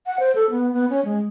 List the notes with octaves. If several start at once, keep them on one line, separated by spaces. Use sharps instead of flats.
F#5
C5
A4
B3
B3
C#4
G#3